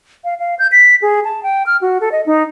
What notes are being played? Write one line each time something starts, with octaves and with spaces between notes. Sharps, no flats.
F5
F5
G6
B6
G#4
A5
G5
F6
F#4
A4
D#5
D#4